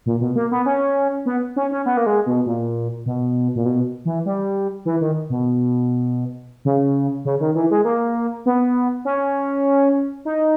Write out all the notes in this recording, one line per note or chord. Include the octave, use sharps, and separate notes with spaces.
A#2
B2
A#3
B3
C#4
B3
C#4
C#4
B3
A#3
G#3
B2
A#2
B2
A#2
B2
E3
G3
E3
D#3
B2
C#3
C#3
D#3
E3
G#3
A#3
B3
C#4
D#4